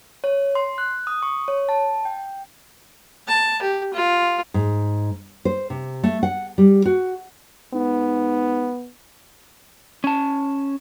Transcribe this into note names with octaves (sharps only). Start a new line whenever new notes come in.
C#5
C6
F#6
D#6
C#6
C#5
A5
G5
A5
G4
F4
G#2
C5
C3
A3
F#5
G3
F#4
G#2 B3
C#4 A5